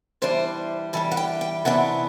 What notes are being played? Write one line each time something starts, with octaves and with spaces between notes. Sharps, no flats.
E3 G3 D4 C5
E3 G3 D4 A4
F#5
G5
G5
C3 E3 B3 D4 F#5